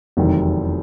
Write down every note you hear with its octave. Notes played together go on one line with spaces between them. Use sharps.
F1 E2 C3 D#3 F#3